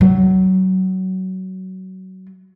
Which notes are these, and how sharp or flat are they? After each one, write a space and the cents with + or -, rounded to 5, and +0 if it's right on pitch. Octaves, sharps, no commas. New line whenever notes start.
F#3 +20